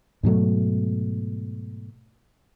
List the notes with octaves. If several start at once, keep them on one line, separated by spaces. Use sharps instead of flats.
G#2 B2 F#3 A3